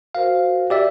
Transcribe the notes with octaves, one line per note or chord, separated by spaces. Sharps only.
F#4 A#4 C5 F5
G4 D5 E5